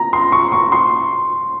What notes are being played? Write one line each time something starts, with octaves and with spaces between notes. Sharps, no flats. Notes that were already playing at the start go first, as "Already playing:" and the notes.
Already playing: A#5
C6
C#6
C#6
C6